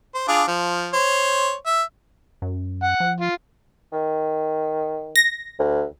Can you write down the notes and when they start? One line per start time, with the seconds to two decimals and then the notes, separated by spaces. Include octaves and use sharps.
0.14 C5
0.28 D4 F4 G#4
0.48 F3
0.94 C5 C#5
1.66 E5
2.42 F#2
2.83 F#5
3.00 F3
3.21 F4
3.92 D#3
5.16 A#6
5.59 D2